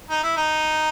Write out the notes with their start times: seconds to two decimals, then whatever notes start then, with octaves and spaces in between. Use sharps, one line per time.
0.10 D#4
0.23 E4
0.37 D#4